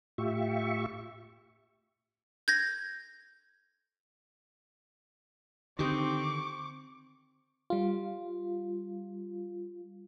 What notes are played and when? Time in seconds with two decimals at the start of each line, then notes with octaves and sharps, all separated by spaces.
0.18 A2 F4 G4 E5 C#6
2.48 G6 G#6 A#6
5.79 D3 D#3 C4 D#4 G4 C#6 D6
7.70 G3 F4